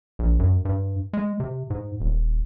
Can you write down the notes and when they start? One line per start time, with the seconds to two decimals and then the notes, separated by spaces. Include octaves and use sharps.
0.19 A#1
0.39 F#2
0.65 G2
1.13 G#3
1.40 C3
1.70 G#2
2.00 D#1